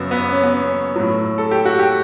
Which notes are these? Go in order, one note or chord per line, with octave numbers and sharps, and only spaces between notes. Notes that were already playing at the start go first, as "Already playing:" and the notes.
Already playing: F#2 C#3 F#3 B3
B3
C#4
B3
C#4
A2 F#3
A4
G4
F#4
G4